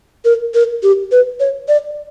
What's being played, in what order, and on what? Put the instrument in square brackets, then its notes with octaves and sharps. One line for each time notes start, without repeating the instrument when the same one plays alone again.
[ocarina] A#4
A#4
G4
B4
C#5
D5